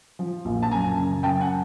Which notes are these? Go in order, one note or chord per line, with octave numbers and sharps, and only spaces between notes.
F3
A#1
A5
F#2 G#5 A#5
C#3
F#2 G5 A5
F#5 G#5